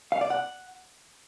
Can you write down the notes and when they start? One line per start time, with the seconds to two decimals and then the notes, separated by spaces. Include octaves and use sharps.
0.12 F5
0.21 D5
0.30 F#5